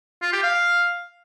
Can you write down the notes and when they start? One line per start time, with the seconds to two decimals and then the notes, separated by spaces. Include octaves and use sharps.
0.22 F4
0.33 G4
0.44 F5